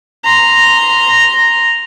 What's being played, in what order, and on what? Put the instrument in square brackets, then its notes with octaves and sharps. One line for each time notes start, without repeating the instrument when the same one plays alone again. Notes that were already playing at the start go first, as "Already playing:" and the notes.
[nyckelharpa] A#5 C6